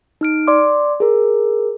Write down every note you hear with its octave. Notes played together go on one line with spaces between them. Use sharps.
D#4 F6 D7
D5 C6 D6
G#4 A#4